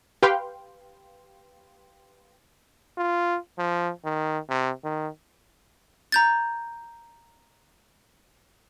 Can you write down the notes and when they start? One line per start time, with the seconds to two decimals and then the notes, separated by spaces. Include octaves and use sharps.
0.23 G4 B4 F5 G5 C6
2.98 F4
3.58 F3
4.05 D#3
4.49 C3
4.84 D#3
6.12 A#5 G6 A6